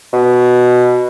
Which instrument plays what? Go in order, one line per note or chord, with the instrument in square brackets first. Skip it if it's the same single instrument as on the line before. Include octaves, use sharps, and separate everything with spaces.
[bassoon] B2